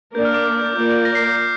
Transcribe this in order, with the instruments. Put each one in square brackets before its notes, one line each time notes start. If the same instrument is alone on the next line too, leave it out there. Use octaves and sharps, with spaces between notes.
[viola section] A#3 D4 A#4 D5 [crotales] G6
[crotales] F6
D6
F6
G6
[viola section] A#3 F4 A#4 D5 [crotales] G6
[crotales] G6
A#6
C7
G6
C7